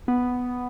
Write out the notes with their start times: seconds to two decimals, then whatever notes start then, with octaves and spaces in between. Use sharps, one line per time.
0.08 B3